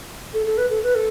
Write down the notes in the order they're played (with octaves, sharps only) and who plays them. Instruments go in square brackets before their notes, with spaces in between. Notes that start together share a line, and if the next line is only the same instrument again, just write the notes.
[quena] A4
A4
B4
A4
B4
A4